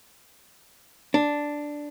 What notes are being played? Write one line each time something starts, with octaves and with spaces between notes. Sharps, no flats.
D4